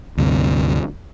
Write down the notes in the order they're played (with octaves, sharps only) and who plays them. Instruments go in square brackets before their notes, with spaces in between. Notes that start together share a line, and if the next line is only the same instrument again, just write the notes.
[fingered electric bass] D2 G2 C3